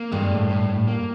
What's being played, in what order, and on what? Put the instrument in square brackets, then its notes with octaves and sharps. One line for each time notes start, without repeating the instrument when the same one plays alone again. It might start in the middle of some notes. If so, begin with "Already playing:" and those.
Already playing: [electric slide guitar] A#3
[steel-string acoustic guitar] G2 [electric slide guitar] G#3
[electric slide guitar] A2
A2
A2
A#3